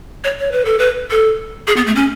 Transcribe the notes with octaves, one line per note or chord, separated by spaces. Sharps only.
C#5
C#5
B4
A4
B4
A4
G#4
B3
A3
C#4